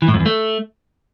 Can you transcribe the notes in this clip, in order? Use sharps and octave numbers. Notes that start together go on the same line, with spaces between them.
E3
A2
F2
E2
A3